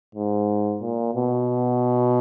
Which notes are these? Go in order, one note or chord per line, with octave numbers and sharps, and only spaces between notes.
G#2
A#2
B2